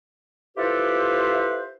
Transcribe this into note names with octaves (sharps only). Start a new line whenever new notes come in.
E4 F4 G4 A4 B4 C5